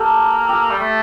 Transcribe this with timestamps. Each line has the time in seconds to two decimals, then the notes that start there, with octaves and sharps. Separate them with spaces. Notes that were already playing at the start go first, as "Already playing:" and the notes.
Already playing: A#3 G4 A4
0.49 G4
0.71 G3
0.80 A3